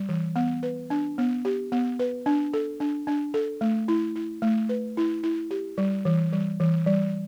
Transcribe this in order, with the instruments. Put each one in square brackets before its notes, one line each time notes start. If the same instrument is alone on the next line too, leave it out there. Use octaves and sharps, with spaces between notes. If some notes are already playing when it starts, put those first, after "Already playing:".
Already playing: [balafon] G3
E3
B3
B4
D4
B3
G4
B3
B4
D4
A4
D4
D4
A4
A3
E4
E4
A3
B4
E4
E4
G4
G3
E3
G3
E3
G3